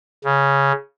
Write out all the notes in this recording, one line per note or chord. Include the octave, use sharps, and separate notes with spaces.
C#3